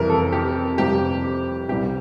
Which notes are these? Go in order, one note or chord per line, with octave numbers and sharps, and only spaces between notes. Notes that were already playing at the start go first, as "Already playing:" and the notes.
Already playing: F2 C3 E3 G3 A#4
A4
G4
F2 C3 G3 G4
C2 C3 G3 G4